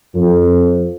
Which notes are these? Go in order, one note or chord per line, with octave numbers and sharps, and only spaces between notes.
F2